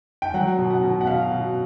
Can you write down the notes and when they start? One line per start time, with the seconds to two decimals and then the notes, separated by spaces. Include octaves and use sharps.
0.22 G5
0.34 F#3 F#5
0.58 B2
0.70 F#5
0.83 B2
1.01 F#5
1.07 B2 F5
1.32 B2